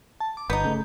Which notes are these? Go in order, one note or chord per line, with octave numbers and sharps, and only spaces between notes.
A5
D6
G1 B3 D#4 G6
C#3 A3